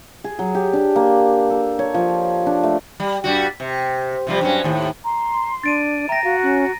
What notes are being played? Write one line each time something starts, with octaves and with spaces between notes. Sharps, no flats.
G#4
F#3
G4
D4
A#3
A4
C#5
F3
D4
A3
G3
G2 G3 F#4
C3
C3 F3 G3
G2 F#3 C#4
D#2 A2
A#5 C6
D4 A6 D7 D#7
E5 G5 A#5 A#6
F#4 F5
C#4